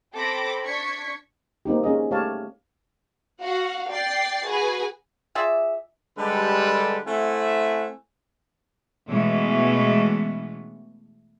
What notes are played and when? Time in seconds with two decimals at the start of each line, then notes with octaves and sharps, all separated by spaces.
0.15 C4 A4 G5 B5 D6 A#6
0.65 D4 C#6 G#6 B6 C#7
1.65 A#3 C4 D#4 G4
1.83 C#4 G#4 D#5
2.11 A3 G4 C#5 F5 A5
3.41 F#4 F5 F#5
3.89 D5 G5 A6 C7
4.45 F#4 G#4 B4 G#5
5.35 F4 G#4 D5 E5
6.18 D3 G3 G#3 G4 A4 B4
7.07 A3 C4 E4 E5 F#5 G#5
9.07 B2 E3 G#3 A3 B3 C#4